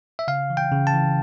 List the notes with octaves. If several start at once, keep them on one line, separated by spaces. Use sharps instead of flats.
E5
C#3 F5
E3
G5
C#3
A5
E3